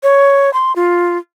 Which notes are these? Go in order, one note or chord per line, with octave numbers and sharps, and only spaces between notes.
C#5
C6
F4